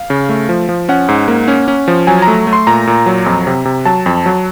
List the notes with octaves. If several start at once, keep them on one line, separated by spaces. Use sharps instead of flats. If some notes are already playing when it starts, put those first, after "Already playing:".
Already playing: F5
C#3
A3
F3
F3
C#4 F#5
G#2
A#3
C#4
C#4
F3
F#3 G#5
A#5
A3
A3
C6
A#2 A#5
A#2
F#3
F2
C3
C3
F#3 A5
F2
F#3